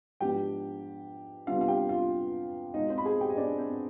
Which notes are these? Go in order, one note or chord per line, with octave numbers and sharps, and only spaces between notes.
G#2 F3 B3 D4 G4 G5
C3 G3 B3 D4 F4 F5
F5
G4 G5
F4 F5
B2 G#3 C4 D#4 D#5
C4 C5
B5
G#4 G#5
G4 G5
D#5
D4 D5
C4 C5